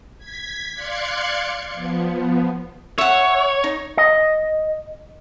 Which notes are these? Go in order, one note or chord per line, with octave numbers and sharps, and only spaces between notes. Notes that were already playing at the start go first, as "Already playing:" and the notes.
G#6 B6
D5 F5 C6 F#6 G#6 C#7
F3 B3
C#5 E5 F#5
D#4
D#5